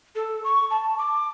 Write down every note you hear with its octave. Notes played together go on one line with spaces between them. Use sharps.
A4
C#6
A5
D6